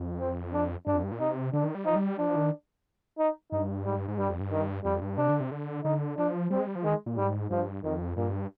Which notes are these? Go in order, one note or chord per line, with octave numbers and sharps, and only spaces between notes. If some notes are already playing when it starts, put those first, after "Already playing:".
Already playing: F2
C4
D4
G2 D4
F2
G2
A#2
C3 D#4
D3 D4
D#3
G3
F3 D#4
G3
F3 D4
D#3
D#4
G2 D#4
G#2 G3
G2
G#2
G2 G3
F2
G2
D#3
F2 G3
G2
C3 D4
D3
C3
D3
D3 D#4
F3 D4
G3 C4
G#3
G3
F3
D#3 G#3
A#2
G#2 G3
G2 F3
F2 D#3
G2 A#2